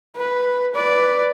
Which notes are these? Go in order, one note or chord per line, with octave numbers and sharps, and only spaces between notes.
B4
B4 D5